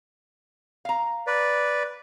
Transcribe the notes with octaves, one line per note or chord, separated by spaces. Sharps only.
F5 A#5
B4 D5